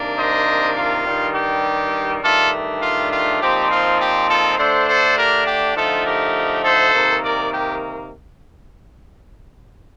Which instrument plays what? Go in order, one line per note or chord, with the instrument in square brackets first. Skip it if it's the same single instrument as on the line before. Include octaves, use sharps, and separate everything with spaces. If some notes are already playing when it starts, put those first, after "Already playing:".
Already playing: [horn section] C3 D#3 A#3 D4
C5 D#5
F4
G2 D#3 G3
G4
G2 D#3 A3 D4 F4 A4
F4
F4
A#2 F3 C4 D#4 G4
F4
G4
F4 A4
D3 A3 D4 A4 C5
A4 C5
G4 A#4
G4
D3 F3 A3 D#4 F4 A4
G4 A#4
A4 C5
C3 D#3 A#3
A#4 D5
G4